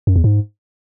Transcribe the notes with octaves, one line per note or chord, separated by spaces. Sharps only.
F#2
E2
G#2